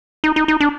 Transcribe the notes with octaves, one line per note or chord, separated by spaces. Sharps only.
D#4
D#4
D#4
D4